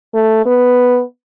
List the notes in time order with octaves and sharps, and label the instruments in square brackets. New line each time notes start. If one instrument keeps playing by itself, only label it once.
[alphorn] A3
B3